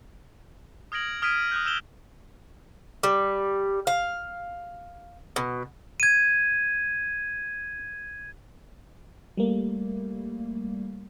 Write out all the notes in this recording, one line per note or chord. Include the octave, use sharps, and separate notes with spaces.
D#6 F6 G#6 A#6 D7 F#7
D#6 F6 G#6 B6 D7 D#7
D#6 F#6 G6
E6 G6 E7 F7 G7
G3
F5
B2
G#6 D#7
G3 A3 A#3